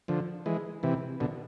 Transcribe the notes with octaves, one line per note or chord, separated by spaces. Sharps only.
D3 F3
E3 G#3
C3 E3
B2 D3